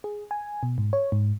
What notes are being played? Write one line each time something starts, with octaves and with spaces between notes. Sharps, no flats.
G#4
G#5
B2
G#2
C#5
G#2